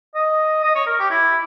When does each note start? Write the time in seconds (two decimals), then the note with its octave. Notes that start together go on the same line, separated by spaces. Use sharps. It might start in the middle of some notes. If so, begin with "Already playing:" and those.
0.15 D#5
0.63 D#5
0.75 C#5
0.86 A#4
1.00 G4
1.11 E4